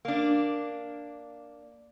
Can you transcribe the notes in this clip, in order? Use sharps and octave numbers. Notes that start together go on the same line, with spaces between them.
A#3 D4